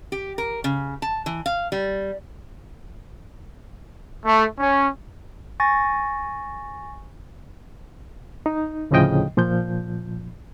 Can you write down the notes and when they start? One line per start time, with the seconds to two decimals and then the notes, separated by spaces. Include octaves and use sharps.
0.12 G4
0.38 A#4
0.64 C#3
1.02 A5
1.26 E3
1.46 F5
1.72 G3
4.25 A3
4.59 C#4
5.60 G#5 C#6 A6 A#6
8.46 D#4
8.91 D2 A2 C#3 F3 D#5 G5
9.37 A#2 F3 G6